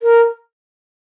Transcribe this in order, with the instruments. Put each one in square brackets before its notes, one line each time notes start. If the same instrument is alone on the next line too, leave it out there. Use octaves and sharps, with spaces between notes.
[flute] A#4